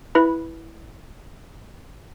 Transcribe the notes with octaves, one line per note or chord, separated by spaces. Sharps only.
E4 B4 B5